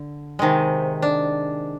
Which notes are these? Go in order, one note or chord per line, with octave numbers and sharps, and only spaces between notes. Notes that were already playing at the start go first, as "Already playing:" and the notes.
Already playing: D3
C3 D#3 G#3
D4